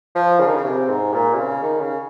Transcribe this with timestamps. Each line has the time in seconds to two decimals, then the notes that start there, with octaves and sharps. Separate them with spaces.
0.15 F3
0.40 C#3
0.47 D#3
0.55 C#3
0.64 C3
0.89 G#2
1.13 A#2
1.34 C3
1.38 C#3
1.63 D#3
1.81 C#3